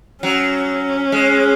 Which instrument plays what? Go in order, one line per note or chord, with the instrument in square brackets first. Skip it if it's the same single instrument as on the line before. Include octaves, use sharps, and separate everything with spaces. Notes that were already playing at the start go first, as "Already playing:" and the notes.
[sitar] F#3 [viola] C#4
[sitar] G#3